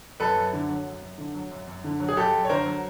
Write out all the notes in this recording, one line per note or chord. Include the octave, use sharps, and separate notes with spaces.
F#2 A4 B4
F#2
D3
F#3
F#2
F#2
D3
F#3
F#2
F#2
D3
F#3
G#4
F#2 G4 A4
F#2
C#5
D3 A#4 C5
F#3